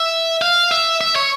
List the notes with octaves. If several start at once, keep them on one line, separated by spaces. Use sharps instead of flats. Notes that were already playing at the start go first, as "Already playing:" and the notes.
Already playing: E5
F5
E5
E5
C#5